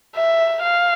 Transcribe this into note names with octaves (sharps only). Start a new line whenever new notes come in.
E5
F5